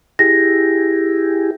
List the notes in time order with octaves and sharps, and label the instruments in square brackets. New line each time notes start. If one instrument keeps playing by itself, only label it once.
[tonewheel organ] E4 G4 G#4 [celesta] A#6